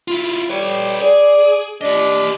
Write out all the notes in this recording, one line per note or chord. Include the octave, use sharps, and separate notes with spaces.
E4 F4
G3 B4 C#5
G#4 D5
D4 G4 D#5